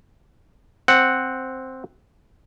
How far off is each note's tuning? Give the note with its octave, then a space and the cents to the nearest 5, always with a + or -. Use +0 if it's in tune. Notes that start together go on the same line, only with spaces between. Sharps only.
C4 +0 F#5 +0